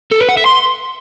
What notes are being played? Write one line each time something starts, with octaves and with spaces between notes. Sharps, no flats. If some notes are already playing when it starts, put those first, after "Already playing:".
A4
B4
F#5
E5
C6